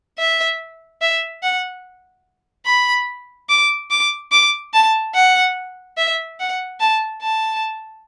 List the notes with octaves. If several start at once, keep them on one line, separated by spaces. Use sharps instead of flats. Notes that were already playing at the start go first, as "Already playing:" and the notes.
E5
E5
F#5
B5
D6
D6
D6
A5
F#5
E5
F#5
A5
A5